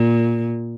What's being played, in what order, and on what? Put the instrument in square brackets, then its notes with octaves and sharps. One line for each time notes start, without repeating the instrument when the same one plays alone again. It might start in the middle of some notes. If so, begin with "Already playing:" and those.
Already playing: [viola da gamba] A#2